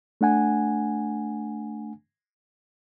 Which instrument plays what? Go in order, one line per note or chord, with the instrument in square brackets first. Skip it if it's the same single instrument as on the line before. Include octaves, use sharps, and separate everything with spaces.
[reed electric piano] A3 D4 F#5 G#5